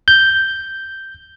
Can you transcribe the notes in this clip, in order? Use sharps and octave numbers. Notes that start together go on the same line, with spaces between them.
G6